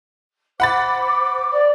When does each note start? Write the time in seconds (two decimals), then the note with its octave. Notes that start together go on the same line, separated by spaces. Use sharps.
0.60 C5 F#5 B5 D6 A6
1.52 D5